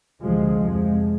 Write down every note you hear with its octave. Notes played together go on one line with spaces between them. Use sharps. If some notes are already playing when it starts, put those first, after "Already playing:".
D2 C3 F3 G#3
F2 C3 F3 G#3